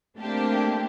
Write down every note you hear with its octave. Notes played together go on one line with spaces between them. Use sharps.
A3 A#3 C4 D4 G4